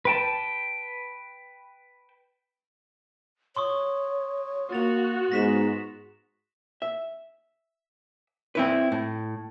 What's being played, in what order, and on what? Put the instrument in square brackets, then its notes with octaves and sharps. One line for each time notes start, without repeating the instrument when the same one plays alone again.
[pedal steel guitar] B4 G5 A5
[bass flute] C#5 [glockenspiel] C6 C#6 D#6
[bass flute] A#3 [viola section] F#4 [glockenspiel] A6 F7
[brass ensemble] G#2 [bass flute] B3 [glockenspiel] A#6 B6 E7
[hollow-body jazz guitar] E5
C4 E4 B4
A2